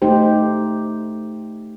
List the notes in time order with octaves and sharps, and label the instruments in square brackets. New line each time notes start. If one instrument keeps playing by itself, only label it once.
[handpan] A3 D#4 G4 C5